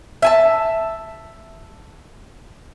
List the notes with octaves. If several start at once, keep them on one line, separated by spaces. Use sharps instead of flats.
E5 G#5 A5